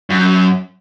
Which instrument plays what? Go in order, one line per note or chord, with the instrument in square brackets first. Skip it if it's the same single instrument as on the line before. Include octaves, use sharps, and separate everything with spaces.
[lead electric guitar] F#2